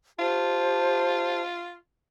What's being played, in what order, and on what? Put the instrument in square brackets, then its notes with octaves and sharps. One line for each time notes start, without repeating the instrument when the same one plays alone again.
[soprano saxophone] F4 [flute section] G4 C5 A5